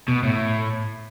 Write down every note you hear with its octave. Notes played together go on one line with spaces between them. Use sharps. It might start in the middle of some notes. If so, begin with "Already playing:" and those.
B2
A2